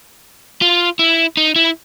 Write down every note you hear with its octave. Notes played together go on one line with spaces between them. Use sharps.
F4
E4
D#4
E4